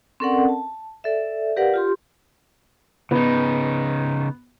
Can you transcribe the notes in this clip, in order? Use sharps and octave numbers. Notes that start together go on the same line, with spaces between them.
C4 C#4 A4 A#4 D5 F#5
A5
A4 D5 E5
G4 A#4 B4 D5 F5 F#5
F4 G4 C6
C#3 B3 D#4